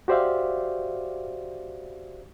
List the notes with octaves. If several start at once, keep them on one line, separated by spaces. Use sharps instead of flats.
F#4 G4 C5 D5 E5 F5